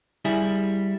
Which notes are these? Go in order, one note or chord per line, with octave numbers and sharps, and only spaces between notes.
G3 E4 G#4